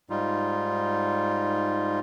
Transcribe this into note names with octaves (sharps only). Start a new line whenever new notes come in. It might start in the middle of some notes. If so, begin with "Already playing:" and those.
G#2 G3 D#4 F4